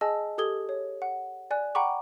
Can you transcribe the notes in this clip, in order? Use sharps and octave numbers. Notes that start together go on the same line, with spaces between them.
G#4 D#5 G#5 A5 E6
G4 A4 D#6 G#6 G7
C#5
F#5
D5 G#5 F#6
F#5 G5 A#5 B5 C#6 D6